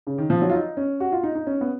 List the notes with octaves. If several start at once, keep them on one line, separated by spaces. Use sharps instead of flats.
C#3
D#3
F3
F#3
F4
D#4
C#4
F#4
F4
D#4
D#4
C#4
B3